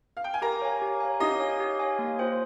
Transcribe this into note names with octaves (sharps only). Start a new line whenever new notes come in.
F5
G5
G#5
G4 A#4 A#5
C#5 F5 G#5
G4
C#5 F5 G#5
D#4 G4 D#5
C#5 F5 G#5
G4
C#5 F5 G#5
A#3
F4 C5 G5